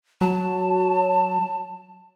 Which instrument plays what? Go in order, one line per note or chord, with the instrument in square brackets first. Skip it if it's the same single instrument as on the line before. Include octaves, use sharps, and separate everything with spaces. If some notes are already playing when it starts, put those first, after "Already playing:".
[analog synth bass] F#3 [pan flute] A5